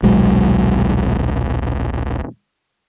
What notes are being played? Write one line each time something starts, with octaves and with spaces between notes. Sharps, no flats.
D#1 B1 F#3 G#3